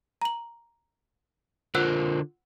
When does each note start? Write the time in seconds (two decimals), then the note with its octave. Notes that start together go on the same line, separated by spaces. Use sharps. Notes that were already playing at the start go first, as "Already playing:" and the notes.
0.22 A#5 F#7
1.75 D3 F4 A#4 C5 F#5 E6 F#6